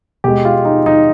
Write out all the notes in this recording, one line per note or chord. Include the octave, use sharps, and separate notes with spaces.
B2 G#3 G4
F4
D#4
D#4